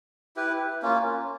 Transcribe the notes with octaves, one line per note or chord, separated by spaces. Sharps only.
E4 G4 B4
A#3 C#4 F4